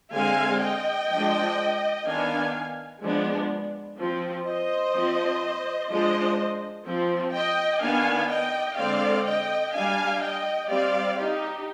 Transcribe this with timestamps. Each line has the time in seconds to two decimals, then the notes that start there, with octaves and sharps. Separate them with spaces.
0.14 D3 G#3 C4 F5 G#5
0.62 D#5 G5
1.10 F3 G#3 D4
2.06 D#3 B3 D4 F5 G#5
3.02 F3 G#3 B3 D4
3.98 F3 C4
4.46 C5 D#5
4.94 F3 C4
5.89 F3 G#3 D4 C5 D#5
6.86 F3 C4
7.34 D#5 G5
7.81 D#3 B3 D4 F5 G#5
8.29 D#5 G5
8.78 D3 G#3 C4 D5 F5
9.25 D#5 G5
9.74 G3 D4 F5 G#5
10.22 D#5 G5
10.69 G3 C4 D5 F5
11.17 D#4 G4